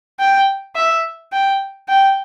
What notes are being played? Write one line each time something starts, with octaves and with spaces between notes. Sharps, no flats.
G5
E5
G5
G5